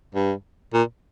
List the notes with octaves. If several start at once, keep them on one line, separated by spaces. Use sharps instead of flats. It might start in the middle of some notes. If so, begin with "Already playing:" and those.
G2
A#2